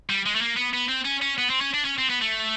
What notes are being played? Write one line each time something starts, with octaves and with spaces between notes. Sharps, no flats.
G3
G#3
A3
A#3
B3
B3
C4
C#4
C#4
B3
C4
C#4
D4
C#4
C4
B3
A3